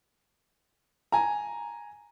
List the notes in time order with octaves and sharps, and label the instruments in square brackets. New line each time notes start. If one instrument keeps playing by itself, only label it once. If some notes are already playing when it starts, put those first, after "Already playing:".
[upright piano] G#5 A#5